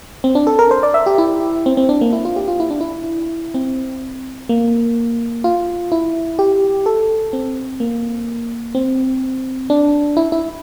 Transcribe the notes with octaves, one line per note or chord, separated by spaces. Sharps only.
C4
D4
A4
A#4
C5
D5
E5
G4
E4
C4
C4
D4
A#3
E4
F4
G4
F4
E4
D4
E4
C4
A#3
F4
E4
G4
A4
C4
A#3
C4
D4
E4
E4